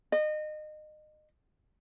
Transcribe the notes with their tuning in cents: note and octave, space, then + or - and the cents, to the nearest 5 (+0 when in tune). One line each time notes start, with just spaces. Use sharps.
D#5 -30